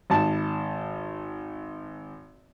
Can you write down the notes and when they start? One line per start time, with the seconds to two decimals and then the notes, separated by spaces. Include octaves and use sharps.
0.10 G#1 A5